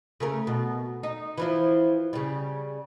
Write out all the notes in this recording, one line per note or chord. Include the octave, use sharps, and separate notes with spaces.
C#3 A3 A#4
B2
D#4
E3 F3 E4
C#3 G3